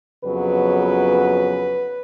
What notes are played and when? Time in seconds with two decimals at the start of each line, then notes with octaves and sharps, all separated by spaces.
0.24 F2 C#3 F#3 B3 B4